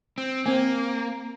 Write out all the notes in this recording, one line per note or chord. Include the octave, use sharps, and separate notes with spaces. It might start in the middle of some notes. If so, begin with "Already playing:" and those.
C4
A#3 C4 G#5